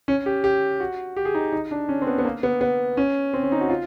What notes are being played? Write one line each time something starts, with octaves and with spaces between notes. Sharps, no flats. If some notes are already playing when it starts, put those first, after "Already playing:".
C#4
G4
G4
F#4
G4
G#4
D#4
D#4
D4
C#4
C4
B3
B3
A#3
B3
B3
C#4
C4
C#4
D#4
F#4
F4